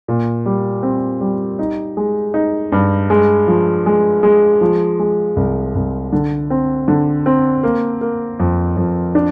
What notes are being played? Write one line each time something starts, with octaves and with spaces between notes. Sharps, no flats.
A#2
G3
C4
G3
D#4
G#3
D#4
G2
G#3
F3
G#3
G#3
F3
G#3
C2
C2
D3
C4
D3
C4
A#3
A#3
F2
F2
D4